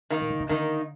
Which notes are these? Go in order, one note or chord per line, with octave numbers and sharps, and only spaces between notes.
D#3 A#3 D#4
A#2
D3
C3
D3 D#3 A#3 D#4